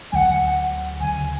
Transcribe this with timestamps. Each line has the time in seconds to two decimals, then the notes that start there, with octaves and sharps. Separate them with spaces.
0.12 D2 D3 F#3 F#5 G#5
1.00 D2 C#3 F#3 G#5